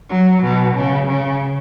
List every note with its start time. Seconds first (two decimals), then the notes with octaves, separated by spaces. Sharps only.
0.10 F#3
0.43 B2
0.76 C#3
1.08 C#3